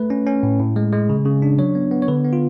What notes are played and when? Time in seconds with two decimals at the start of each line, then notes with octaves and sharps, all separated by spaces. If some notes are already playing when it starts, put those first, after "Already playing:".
Already playing: A3 B4
0.10 C#4
0.27 C#4
0.43 A2
0.60 A2
0.76 G#3
0.93 G#3
1.09 C#3
1.26 C#3
1.42 D4
1.59 F#3 C#5
1.75 B3
1.91 B3
2.02 C#5
2.08 D3 B4
2.25 B3
2.33 F4